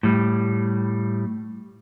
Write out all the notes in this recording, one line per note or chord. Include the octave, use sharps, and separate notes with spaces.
A2 G3